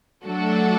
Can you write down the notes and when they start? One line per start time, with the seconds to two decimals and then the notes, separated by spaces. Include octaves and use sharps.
0.23 F#3 A3 D4 F#4 A4